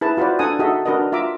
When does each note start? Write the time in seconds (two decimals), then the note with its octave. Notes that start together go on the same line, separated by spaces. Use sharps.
0.01 E4 G#4 B4 A5
0.17 F4 F#4 B4 C5 D5
0.39 D4 A4 F#5 G#5 A#5 D#6
0.59 D#4 F#4 G#4 A4 D#5 E5
0.85 D4 F#4 A#4 B4 D#5
1.12 F4 E5 A#5 D6